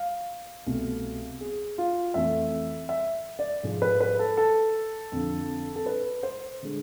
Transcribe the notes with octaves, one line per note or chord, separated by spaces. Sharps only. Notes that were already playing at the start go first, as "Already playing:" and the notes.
Already playing: F5
C2 B2 A3
G#4
F4
F2 E3 A3 E5
E5
D5
G#2 F3 G#3
B4
B4
A4
A4
F2 D3 F3
A4
B4
C5
D3 G#3